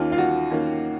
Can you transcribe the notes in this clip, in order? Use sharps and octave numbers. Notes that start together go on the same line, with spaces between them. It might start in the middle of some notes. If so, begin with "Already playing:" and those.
Already playing: D#2 D#3 A#3 C#4 F4
F4
F#4
D#3 A#3 C#4